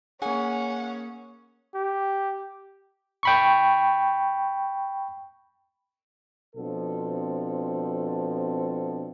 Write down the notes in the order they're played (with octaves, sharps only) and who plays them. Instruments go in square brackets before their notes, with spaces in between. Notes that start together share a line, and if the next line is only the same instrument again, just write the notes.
[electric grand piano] A#3 G#4 [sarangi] C#4 [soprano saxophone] F#5 [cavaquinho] G#5
[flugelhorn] G4
[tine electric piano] G5 B5 C#6
[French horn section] B2 F3 C4 D4 A4